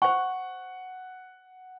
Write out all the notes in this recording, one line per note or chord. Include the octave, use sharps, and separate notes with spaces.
C5 F#5 C#6